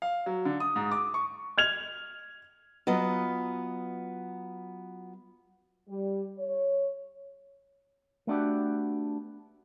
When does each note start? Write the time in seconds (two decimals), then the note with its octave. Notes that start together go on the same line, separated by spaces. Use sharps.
0.02 F5
0.26 F#3
0.45 D3
0.60 D#6
0.76 G#2
0.92 D6
1.14 C#6
1.58 F6 G#6 F7
2.87 F#3 B3 F4 D#5
5.88 G3
6.38 C#5
8.27 A3 B3 D4 F#4 G4